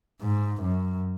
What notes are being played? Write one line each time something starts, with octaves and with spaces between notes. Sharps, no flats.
G#2
F#2